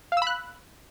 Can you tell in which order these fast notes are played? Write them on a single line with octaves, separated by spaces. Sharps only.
F5 E6 B5 F#6